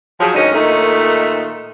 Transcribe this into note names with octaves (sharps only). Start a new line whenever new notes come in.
F3 F#3 G#4
D2 G#2 D#3 C#4 D#4 D#5
A#2 D#3 A3 D#4